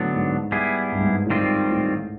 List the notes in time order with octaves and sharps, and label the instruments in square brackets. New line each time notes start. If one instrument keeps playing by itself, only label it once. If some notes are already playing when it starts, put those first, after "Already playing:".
Already playing: [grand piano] A2 [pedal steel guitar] D3 F#3 B3 D4
[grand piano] G#2
[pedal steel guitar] G3 B3 E4 G#4
[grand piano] G2
G#2
G2
A2
[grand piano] G#2 [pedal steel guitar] D#3 G3 C4 F4
[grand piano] A2